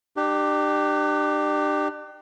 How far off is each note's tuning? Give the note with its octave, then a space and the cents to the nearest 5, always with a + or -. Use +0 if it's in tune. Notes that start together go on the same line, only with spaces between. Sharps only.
D4 +40 G4 +0